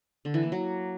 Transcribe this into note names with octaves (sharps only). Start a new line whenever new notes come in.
D3
E3
A#3
F#3